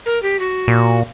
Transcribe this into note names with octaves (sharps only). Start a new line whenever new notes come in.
A#4
G4
F#4
A#2